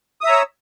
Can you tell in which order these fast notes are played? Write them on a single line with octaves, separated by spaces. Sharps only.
D#6 E5 A#5 C#5 E6